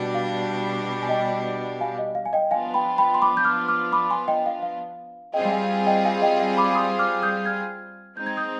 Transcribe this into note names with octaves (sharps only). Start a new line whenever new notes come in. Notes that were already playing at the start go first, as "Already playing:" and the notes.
Already playing: B2 G3 D4
F5
G#5
D#5 G5
F5 G#5
D#5
F5
G#5
D#5 G5
F3 B3 D4 F4 F5 G#5
G5 B5
G5 B5
C6
B5 D6
G6
D6 F6
D6 F6
B5 D6
G#5 C6
D#5 G5
F5
F5
G3 C4 F4 G#4 D#5 G5
F5 G#5
D#5 G5
F5 G#5
D#5 G5
F5
B5 D6
C6 D#6
D6 F6
D#6 G6
F6 G#6
G#3 C4 D#4 G6
G#6
D#6 G6